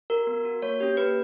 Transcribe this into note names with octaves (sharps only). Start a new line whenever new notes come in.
F#4 A#4
B3
F#4
A#3 C#5
C#4 G4
A#3 B4